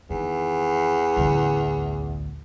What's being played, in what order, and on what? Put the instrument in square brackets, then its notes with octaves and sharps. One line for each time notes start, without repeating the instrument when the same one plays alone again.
[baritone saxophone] E2 [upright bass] D#3
[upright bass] A1 D2